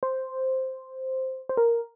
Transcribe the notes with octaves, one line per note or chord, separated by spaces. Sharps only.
C5
C5
A#4